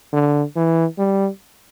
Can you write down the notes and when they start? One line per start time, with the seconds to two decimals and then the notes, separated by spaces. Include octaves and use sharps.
0.13 D3
0.56 E3
0.98 G3